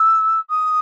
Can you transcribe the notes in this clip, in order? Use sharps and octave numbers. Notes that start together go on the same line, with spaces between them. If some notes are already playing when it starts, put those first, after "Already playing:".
Already playing: E6
D#6